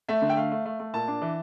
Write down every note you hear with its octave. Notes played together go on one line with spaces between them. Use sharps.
A3 E5
D3
G5
A3 F5
A3
A3
A3
A#2 A5
D4
E3